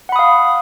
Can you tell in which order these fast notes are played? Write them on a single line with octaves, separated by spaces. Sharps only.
F#5 B5 D#6 F5